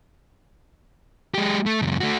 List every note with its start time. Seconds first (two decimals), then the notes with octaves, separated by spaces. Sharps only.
1.35 G#3 G4
1.66 A3
1.82 C#2 F#2
2.00 A3 F#4